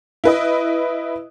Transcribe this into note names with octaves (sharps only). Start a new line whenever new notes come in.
E4 B4 D#5